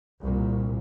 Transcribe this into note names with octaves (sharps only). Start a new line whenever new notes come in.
C2 A#2